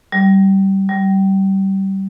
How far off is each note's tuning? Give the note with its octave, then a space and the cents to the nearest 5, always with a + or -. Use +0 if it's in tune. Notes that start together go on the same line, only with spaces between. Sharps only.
G3 -20
G3 -25